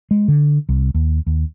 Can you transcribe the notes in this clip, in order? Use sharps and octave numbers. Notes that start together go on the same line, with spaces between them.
G#3
D3
C2
D#2
D#2